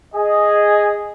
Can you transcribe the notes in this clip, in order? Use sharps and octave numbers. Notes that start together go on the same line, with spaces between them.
G#4 D#5